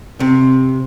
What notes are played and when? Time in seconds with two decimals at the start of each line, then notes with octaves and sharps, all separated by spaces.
0.20 C3